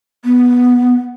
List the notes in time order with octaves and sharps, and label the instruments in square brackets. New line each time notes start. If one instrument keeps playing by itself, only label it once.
[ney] B3